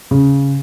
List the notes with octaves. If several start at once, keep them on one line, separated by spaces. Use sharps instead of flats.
C#3